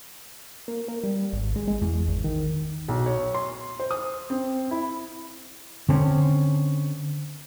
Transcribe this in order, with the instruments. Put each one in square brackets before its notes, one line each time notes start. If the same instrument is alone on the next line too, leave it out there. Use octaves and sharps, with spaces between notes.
[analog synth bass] A#3
A#3
G3
G#1
G#3
G#3
E2
G#1
D#3
[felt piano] B1
C#5
C6
C5
D#6
C4
E4
[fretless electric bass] D3 C4 C#4